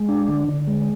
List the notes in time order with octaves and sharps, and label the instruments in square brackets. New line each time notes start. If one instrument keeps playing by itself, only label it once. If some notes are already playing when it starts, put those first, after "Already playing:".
Already playing: [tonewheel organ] G#3
D4
D3
D3
G#3